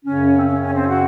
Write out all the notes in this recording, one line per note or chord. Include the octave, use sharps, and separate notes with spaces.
F#2 C#3 C#4
C4
C#4
C#4
C4
F#4